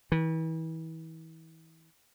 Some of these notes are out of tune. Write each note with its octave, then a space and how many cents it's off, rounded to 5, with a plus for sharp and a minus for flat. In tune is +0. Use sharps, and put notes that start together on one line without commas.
E3 -35